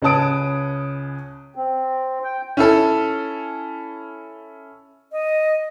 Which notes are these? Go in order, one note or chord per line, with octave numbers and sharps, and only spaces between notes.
C#2 C#4 B4 A5 D#6 D7
C4
G5
C#4 E4 A4
D#5